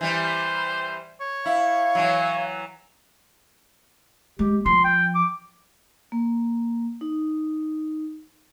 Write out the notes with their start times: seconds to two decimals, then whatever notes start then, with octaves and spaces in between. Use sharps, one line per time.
0.01 E3 G3 C5
1.21 C#5
1.46 E4 F5
1.95 E3 F#3
4.39 G#3 G4
4.66 F3 C6
4.84 G5
5.15 D6
6.12 A#3
7.01 D#4